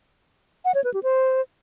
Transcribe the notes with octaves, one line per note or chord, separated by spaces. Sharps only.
F#5
C#5
B4
G4
C5